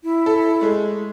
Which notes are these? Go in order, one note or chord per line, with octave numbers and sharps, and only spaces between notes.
E4
A4
G#3 A3